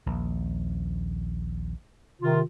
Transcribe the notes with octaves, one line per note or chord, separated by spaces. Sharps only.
A#1 D#2
C3 D#3 F4